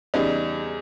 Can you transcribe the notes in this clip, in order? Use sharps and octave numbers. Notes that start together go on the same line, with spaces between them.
E2 C#3 G3 D#4